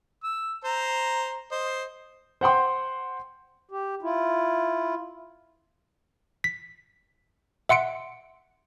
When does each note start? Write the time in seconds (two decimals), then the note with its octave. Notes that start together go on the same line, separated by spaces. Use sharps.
0.24 E6
0.64 C5 A#5
1.51 C5 D#5
2.41 C5 F#5 G5 C6
3.71 G4
4.02 E4 F4
6.44 B6
7.69 E5 F#5 C6 C#7 D7